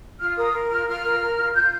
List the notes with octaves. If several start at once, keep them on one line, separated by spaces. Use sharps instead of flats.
F4 F6
A#4 D#6
A#4
F4 F6
F4 F6
A#4
A#4
F4
F4 G6